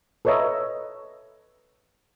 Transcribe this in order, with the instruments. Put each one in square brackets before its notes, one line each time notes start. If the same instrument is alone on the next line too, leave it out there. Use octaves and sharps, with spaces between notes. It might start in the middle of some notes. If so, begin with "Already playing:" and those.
[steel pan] A4 B4 C#5 D#5 E5 A#5